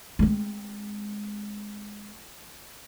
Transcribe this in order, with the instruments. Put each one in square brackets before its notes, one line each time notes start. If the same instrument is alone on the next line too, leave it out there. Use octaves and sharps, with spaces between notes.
[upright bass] G#3 C4